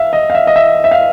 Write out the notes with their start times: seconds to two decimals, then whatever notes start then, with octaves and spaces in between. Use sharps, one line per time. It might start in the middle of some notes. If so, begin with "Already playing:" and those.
Already playing: E5 F5
0.13 D#5
0.30 F5
0.35 E5
0.47 D#5
0.56 E5
0.84 E5
0.91 F5